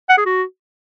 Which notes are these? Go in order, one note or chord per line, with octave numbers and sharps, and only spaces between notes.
F#5
G#4
F#4